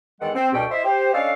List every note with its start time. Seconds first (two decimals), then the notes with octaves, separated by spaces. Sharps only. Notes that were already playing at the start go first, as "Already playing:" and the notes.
0.21 E2 D#3 G#3 A4 F#5
0.34 C4
0.52 C#2 G2 B2 G4 A4 G5
0.71 E4 C5 D#5 E5
0.84 G4 C5
1.13 C#4 D4 A4 D#5 F5